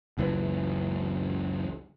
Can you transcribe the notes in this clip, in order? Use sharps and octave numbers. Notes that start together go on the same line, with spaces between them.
F#1 C#2 F#2 E3